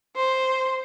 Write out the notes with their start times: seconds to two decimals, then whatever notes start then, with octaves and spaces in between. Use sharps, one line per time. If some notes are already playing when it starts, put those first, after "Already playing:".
0.16 C5